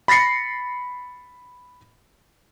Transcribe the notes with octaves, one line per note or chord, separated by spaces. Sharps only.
B5 A6 A#6 C7 C#7